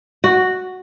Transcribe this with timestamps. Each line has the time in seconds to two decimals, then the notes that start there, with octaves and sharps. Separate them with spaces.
0.24 F#4